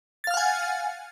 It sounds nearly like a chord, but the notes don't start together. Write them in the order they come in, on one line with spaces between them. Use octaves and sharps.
A6 F5 F6 F#5 G#5